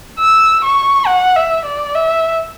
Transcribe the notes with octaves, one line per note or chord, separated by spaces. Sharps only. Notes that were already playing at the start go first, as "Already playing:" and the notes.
E6
C#6
F#5
E5
D5
E5